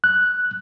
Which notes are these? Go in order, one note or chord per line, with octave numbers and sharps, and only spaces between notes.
F#6